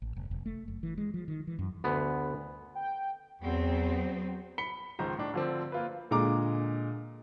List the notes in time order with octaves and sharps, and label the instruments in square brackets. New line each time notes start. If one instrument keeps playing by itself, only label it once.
[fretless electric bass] A1
F1
F1
A3
F#1
E3
G#3
F3
D#3
E3
F#2
[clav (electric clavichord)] D2 B3
[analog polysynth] G5
[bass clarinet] E2 [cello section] F#3 B3 C4
[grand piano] B5 B6 C#7 G7
C#2 G#2 D#3 F3 C5 A#5
A2 D4
D3 F3 C4
A#3 F4 B4
[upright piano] A#2 D3 G#3 A#5 D6